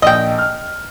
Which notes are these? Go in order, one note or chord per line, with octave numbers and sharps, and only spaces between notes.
A#1 D#5 G5
F6